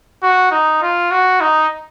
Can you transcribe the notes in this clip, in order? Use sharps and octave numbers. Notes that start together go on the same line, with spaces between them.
F#4
D#4
F4
F#4
D#4